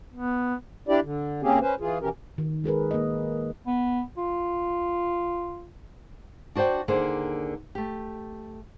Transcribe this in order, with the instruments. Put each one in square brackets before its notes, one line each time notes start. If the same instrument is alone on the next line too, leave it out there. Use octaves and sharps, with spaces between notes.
[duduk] B3
[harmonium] D4 E4 G4 D5
D3
C#3 A#3 C4 C#4 G4 G#4
C#4 B4 C5
E3 F4 G#4
B2 E3 C#4 G4 A#4
[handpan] D#3
G#3 G#4 A#4 B4
A#3 D#5
[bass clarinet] B3
F4
[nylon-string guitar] D4 F#4 C5 D5 G5
D#2 D3 A#3 G#4 C5
A3 G4